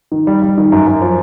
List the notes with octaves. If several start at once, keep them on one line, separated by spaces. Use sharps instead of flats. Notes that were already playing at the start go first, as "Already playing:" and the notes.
D#3
G3
G3
D#3
F#2
F#2
F3